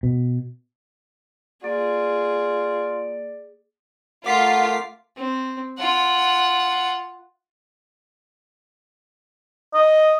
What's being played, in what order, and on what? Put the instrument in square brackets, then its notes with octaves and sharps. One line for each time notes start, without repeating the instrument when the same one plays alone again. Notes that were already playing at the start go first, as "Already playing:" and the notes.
[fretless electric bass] B2
[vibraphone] A#3 [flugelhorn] F4 [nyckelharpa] G#4 [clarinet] D5
[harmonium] A3 A#4 F5 [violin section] F4 [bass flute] F#5 [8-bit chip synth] D6 B6 C7
[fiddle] C4
F4 F#5
[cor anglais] D#5